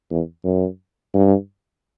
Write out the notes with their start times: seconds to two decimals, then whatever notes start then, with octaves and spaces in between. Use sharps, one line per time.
0.11 E2
0.45 F#2
1.14 G2